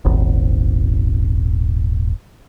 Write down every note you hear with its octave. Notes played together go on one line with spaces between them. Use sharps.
D#1 G#1